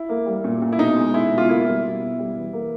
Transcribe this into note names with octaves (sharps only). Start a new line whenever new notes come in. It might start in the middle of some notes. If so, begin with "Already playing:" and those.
Already playing: E4
A#3
G3
A#2
A#2
E4
B2 D#4
G#3
G#3 E4
B2
F4
A#3 E4
G3
B2
B2
G3
E3
A#3